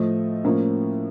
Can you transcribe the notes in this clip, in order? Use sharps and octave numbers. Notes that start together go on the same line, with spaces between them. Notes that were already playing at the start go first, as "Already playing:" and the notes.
Already playing: A2 F3 A3 D#5
A2 F3 A#3 C#4